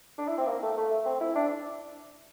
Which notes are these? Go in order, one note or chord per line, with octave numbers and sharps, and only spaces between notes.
D4
E4
C4
A#3
A3
A3
C4
E4
D4